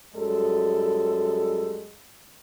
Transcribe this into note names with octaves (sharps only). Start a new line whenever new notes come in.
F#2 G3 G#3 A4